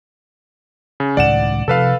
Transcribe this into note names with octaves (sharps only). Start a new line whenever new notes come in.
C#3
C#2 A2 D#3 D5 F#5 E7
C3 F3 A4 B4 F5